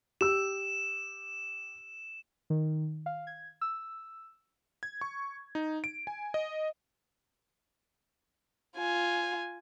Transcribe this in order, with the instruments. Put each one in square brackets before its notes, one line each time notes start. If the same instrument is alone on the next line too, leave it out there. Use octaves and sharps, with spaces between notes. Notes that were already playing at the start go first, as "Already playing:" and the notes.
[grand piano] G4 E6 [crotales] E7
[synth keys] D#3
F5
G#6
E6
[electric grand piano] G#6
C#6
D#4
D7
G#5
D#5
[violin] F4 G#5